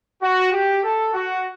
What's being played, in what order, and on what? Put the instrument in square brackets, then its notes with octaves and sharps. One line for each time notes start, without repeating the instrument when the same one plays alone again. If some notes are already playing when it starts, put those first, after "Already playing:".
[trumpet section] F#4
G4
A4
F#4